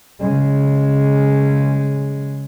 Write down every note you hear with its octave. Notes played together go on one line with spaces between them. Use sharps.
C#3 G#3